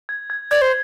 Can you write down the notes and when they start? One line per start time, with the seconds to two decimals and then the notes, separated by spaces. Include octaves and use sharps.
0.09 G#6
0.30 G#6
0.51 D5 G#6
0.62 C5